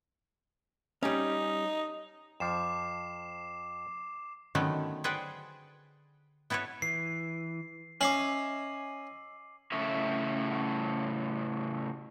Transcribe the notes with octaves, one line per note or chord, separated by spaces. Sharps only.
G3 C#4 D#4
F2 F3 D6 C7 E7
D3 D#3 F#3 A3 B3 C#4
G#4 B4 C5 D5 F#5 G5
B3 E4 A4 B4 C#5
E3 C7
C#4 D#5 E5 G#5 D6 C7 F#7
A2 C#3 C#5 E5